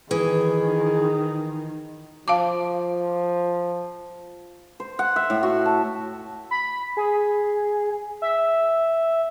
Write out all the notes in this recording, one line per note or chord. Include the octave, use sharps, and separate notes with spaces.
D#3 E3 G#4
F3 F5 A5 D6
C5
F#5
E5
A2
F#4
A5
B5
G#4
E5